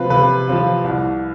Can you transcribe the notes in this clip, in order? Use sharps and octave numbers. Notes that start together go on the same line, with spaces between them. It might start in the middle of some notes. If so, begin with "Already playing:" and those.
Already playing: C3 F3 C4 F4 B4
C3 B4
F3 C4 F4
C2